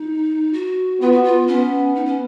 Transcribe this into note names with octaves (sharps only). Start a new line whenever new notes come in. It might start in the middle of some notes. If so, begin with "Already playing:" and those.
Already playing: D#4
F#4
B3 F4
F#4
F4
B3 C#4
D#4
C#4